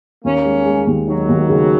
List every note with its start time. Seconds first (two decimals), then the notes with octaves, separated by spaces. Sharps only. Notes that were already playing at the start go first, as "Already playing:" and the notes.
0.24 D#2 A#3 C#4
0.45 G#3
0.66 G#3
0.87 D#2
1.07 D#3 F#3 D#4
1.29 D#2
1.49 C#3